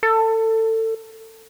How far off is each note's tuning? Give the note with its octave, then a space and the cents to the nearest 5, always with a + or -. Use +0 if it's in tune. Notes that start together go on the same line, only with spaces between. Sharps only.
A4 +25